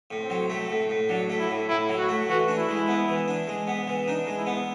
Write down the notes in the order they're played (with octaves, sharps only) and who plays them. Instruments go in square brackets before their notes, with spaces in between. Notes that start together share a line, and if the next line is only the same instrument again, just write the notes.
[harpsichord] A2
[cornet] C4
[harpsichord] F#3
A3
A2
A2
[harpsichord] F#3 [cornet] D4
[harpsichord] A3
[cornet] E4
[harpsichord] A2
[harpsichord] A2 [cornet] E4
[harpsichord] F#3
[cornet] F#4
[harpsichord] A3
[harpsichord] E3 [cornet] F#4
[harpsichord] D4
[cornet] E4
[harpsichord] G#3
B3
E3
D4
G#3
B3
E3
[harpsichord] D4 [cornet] D#4
[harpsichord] G#3
[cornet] E4
[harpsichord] B3